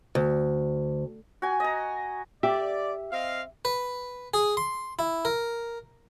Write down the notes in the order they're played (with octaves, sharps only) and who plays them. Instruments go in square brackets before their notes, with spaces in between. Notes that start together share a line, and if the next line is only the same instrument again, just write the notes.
[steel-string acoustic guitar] D2
[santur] F#4 G#5
D#5 A#5
[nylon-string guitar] G4 [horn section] D5 [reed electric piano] E5
[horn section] C4 D#5 F5
[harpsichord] B4
G#4
C6
E4
A#4